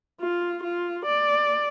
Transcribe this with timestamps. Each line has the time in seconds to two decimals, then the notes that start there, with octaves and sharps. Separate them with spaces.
0.21 F4
0.63 F4
1.06 D5